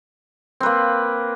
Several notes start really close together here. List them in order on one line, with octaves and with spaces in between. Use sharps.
C4 B4 A#3